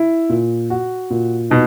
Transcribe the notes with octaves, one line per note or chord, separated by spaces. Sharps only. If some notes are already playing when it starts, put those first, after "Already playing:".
Already playing: E4
A#2
F#4
A#2
B2 D#4